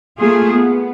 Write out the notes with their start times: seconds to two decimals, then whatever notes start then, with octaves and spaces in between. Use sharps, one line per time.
0.19 A3 A#3 F4 G#4
0.52 B3